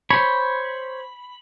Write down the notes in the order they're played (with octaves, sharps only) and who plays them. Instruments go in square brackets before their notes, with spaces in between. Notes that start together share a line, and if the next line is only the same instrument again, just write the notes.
[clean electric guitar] C5 C#5 [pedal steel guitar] B5